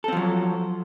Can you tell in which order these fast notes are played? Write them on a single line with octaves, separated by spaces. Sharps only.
A4 C4 F3 F#3